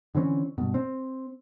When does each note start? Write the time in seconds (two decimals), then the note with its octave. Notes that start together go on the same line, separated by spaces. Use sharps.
0.15 D3 E3 C4 C#4
0.58 G2 B2
0.74 C4